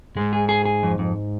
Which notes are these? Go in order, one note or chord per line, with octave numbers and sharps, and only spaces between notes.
G#2 G#3
G#4
G#4
G#4
F2
F2